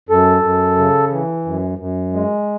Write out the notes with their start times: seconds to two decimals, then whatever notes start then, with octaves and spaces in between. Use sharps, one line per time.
0.09 F#2 A4
0.43 F#2
0.77 C#3
1.11 E3
1.46 F#2
1.79 F#2
2.13 G#3